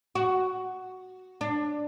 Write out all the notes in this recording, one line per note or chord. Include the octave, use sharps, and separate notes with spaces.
F#4
D4